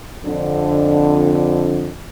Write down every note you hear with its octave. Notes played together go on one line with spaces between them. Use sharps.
F2 D3